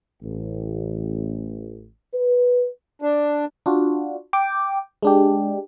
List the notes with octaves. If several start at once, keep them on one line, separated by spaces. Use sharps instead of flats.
A1
B4
D4
D4 F4 F#4
G5 D6
G#3 D4 G4